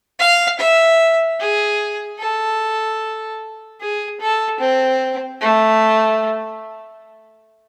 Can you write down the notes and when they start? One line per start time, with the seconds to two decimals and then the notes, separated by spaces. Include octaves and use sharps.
0.19 F5
0.59 E5
1.40 G#4
2.19 A4
3.80 G#4
4.20 A4
4.60 C4
5.41 A3